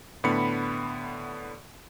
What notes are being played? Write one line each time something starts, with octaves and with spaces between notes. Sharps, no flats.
A2 D3 B3 B5 C#7